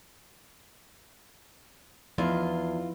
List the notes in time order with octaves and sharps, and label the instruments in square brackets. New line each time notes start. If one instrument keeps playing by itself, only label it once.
[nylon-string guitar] E2 [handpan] F3 D#4 [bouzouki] F4